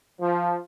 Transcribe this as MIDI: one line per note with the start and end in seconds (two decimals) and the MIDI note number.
0.19 0.56 53